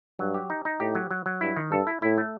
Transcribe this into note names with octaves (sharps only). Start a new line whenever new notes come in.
G2 F#3
G4
D#4
D#4
A2 G4
F#3
F#3
F#3
G2 E4
D#3
G2 A4
E4
A2 E4
A3